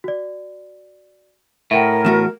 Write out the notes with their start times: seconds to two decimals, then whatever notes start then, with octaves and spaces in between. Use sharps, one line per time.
0.04 F#4 D5
1.71 A2 A#4 E5 F#5 G5
2.05 E2 A3 F#4 E7